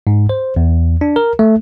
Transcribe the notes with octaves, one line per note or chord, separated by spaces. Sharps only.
G#2
C5
E2
D4
A#4
A3